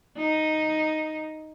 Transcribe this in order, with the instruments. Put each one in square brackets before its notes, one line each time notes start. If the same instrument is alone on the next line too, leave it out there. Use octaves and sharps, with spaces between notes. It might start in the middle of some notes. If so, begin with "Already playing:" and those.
[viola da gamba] D#4